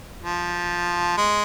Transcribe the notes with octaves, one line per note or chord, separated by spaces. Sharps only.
F3
G#3